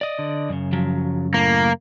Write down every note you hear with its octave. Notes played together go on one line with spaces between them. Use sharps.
D5 D#5
D3
F#2 C#3
F3 F#3
A2 A#3